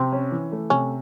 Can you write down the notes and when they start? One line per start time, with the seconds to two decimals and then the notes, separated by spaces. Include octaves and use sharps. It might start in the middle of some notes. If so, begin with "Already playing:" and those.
Already playing: C3 C4
0.12 C#4
0.32 E3
0.52 A3
0.70 C3 C#4